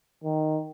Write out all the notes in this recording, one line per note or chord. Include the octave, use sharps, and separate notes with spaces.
D#3